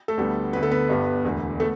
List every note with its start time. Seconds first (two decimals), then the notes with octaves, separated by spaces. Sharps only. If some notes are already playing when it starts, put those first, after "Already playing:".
0.08 A3 A4
0.17 D2 D3 G3 B3
0.53 D2 D3 B3 B4
0.63 A4
0.71 B3 B4
0.89 G1 G2 G3 B3
1.24 E1 D2 D3
1.60 A3 B3 A4